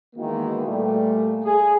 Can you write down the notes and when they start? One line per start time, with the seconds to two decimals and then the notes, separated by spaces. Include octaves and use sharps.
0.16 D#3 E3 G#3 A#3 B3 F#4
0.67 A#2 G3 A3
1.44 G#4